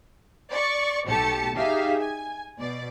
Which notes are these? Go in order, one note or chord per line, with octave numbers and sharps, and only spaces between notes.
D5 C#6
B1 A3 G4 A5 C#7
D#4 G4 G#4 E5 F5
G#5
B2 D5